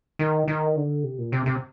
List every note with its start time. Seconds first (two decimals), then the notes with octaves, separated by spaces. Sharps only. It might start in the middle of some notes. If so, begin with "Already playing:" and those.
0.19 D#3
0.48 D#3
0.76 D3
1.03 C3
1.18 A#2
1.32 C3
1.46 C3